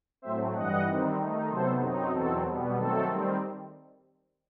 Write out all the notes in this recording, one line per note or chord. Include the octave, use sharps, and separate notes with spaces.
A2 F#3 A3 C4 C5 E5
G2 E3 G3 D#5 F#5
D#3 G3 C4 D#4
D#3 A3 D#4
C3 F#3 B3 A4 C5
F#2 F#3 C4 D#4
E2 B2 F#3 C4 A4
B2 G3 B3
D#3 F#3 A3 C4 A4
D#3 G3 C4